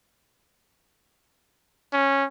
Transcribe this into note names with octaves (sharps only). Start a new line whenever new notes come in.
C#4